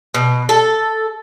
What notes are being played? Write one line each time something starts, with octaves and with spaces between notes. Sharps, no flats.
B2
A4